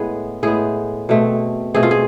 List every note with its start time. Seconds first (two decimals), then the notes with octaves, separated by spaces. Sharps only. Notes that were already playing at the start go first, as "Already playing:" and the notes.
Already playing: A2 G#3 B3 G#4
0.43 A2 G#3 B3 G#4
1.09 B2 A3 C4
1.74 B2 A3 C4 G#4
1.83 F4
1.91 G#4